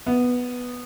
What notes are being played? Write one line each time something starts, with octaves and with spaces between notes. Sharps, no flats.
B3